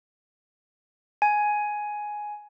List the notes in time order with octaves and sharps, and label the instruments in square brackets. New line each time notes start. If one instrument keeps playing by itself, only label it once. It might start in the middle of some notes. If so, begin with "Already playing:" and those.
[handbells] G#5